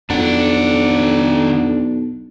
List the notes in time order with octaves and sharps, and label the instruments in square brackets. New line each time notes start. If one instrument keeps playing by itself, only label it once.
[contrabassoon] B1 [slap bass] F2 [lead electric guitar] D#3 F#5 [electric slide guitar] D4